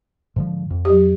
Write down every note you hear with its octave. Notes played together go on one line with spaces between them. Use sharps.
G#2 D3 F3
F2
F#3 G4